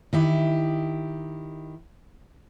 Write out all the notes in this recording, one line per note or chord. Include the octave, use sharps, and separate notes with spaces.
D#3 E4 G4